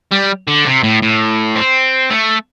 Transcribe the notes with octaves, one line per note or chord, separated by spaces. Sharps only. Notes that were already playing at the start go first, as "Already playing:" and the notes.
G3
D3
C3
A2
A2
C4
A3